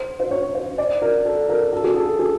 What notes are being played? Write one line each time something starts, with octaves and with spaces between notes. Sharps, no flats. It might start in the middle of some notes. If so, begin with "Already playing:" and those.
Already playing: C5
C5
C#5
C5
D5
A#4
A4
A#4
A4
G#4
A4
G#4